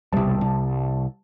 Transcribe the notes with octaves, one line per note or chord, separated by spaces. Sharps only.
E1 C2 G3 A5
C2